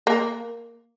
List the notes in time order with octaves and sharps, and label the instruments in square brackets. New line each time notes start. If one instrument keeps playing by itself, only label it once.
[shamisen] A#3